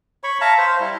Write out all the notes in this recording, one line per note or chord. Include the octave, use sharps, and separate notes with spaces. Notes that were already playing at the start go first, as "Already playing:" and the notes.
C#5 B5 C#6
E5 F5 A5 A#5
C5
G3 E4